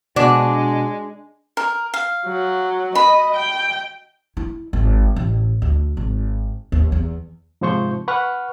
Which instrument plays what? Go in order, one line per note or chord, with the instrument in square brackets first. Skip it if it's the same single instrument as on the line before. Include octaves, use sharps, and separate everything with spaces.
[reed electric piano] B2 F#4 [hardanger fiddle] G#3 [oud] D4
[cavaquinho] A#4
F5
[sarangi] F#3
[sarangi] D#5 [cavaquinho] B5
[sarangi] G5
[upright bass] E4
G#1
A1
D2
G#1
D#2
E2
[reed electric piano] G#2 C3 F3 C5 C#6 G6
B4 F#5 C#6 F6 F#6